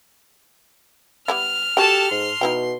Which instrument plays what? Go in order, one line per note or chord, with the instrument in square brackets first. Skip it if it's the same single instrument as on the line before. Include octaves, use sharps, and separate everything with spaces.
[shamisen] G3 B3 E4 [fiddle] F6
[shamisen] F#4 G5 [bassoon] G4 [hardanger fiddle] A4 A5
[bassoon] G#2 [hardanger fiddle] C6
[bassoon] B2 [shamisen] D#4 E4 G5